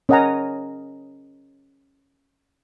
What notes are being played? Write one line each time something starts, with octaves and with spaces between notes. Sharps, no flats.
C#4 A#4 D#5 F#5 G#5 A#5